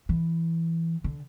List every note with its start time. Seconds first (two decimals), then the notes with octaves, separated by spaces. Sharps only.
0.09 E3
1.04 D3